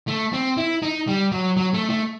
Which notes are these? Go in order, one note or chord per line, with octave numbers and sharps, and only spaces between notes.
A3
C4
E4
D#4
G3
F#3
F#3
A3
A3